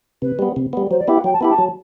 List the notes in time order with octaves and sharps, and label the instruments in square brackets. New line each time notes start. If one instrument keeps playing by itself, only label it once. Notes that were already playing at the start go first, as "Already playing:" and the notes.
[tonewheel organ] C3 [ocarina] B4
[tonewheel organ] G3 B3
C3
G3 B3
[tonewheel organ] F#3 [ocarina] C5
[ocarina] D5
[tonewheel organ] B3 E4 G4 [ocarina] E5
[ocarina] F#5
[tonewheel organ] F#3 [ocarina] G5
[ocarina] A5
[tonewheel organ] B3 E4 G4 [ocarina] B5
[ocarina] A5
[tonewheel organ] F#3